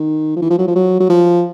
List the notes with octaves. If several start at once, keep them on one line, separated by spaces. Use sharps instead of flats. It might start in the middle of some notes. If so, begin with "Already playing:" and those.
Already playing: D#3
F3
E3
F3
F#3
F3
F#3
F#3
F3